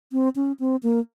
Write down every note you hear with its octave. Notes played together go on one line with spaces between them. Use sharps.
C4
C#4
C4
A#3